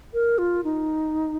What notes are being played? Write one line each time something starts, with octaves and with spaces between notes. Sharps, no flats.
A#4
F4
D#4